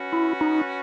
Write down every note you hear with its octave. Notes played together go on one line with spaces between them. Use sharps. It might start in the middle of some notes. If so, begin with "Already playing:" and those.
Already playing: C#4 F#4 B4
E4
D#4